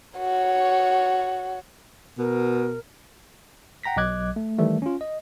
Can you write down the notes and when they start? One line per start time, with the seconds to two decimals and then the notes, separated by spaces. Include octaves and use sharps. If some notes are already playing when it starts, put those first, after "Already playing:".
0.19 F#4 C#5
2.19 B2 A#4
3.83 F#5 G5 A#5 A#6 B6
3.97 B1 F#3 D#5 D6 F#6 G#6
4.36 A3
4.59 D#3 E3 G3 A3
4.82 C#4 F4
5.01 D#5